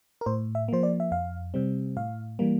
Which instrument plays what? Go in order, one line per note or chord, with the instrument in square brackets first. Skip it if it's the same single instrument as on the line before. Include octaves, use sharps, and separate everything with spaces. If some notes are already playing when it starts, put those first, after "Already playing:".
[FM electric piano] A#4
A2 C5
E5
F3 A#3 C5
D5
E5
F2 F5
C3 G3 C4
A2 F5
E3 G3 A#3